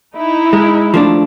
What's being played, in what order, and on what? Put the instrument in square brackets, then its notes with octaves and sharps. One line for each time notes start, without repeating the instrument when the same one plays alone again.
[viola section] D#4 E4
[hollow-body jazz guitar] G#3
F3 A3 D4